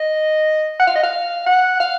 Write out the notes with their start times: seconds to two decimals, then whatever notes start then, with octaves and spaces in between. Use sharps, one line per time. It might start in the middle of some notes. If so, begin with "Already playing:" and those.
Already playing: D#5
0.79 F#5
0.87 F5
0.95 D#5
1.03 F5
1.46 F#5
1.80 F5